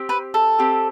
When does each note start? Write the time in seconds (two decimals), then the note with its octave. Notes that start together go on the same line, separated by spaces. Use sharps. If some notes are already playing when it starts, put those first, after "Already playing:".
Already playing: C4 G4
0.09 B4
0.34 A4
0.59 C4 G4